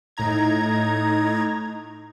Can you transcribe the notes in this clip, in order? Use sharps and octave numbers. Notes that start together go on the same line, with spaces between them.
A2 D#4 A#5 G#6